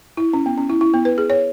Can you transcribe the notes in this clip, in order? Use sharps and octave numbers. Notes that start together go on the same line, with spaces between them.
E4
C#4
B3
C#4
E4
E4
B3
B4
G#4
C#5